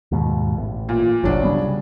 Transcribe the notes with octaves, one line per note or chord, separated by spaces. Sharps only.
D#2 G#2 B2
A1
A#2
G1 C2 F#3 D4
C#3 G3 B3